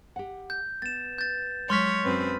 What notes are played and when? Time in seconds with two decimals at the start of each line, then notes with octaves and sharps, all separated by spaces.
0.16 G4 F#5
0.50 G6
0.82 B3 A6 E7
1.18 G6 A6
1.70 F#3 G#3 C#5 C6 F6 B6
2.04 F#2 C4 B4